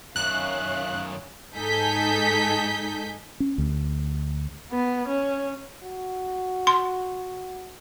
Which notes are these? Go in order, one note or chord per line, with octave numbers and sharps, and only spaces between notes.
F#2 D#3 C#4 E5 F5 F#6
G#2 D#4 A4 G#5 G6 B6
C#4
D2
B3
C#4
F#4
C6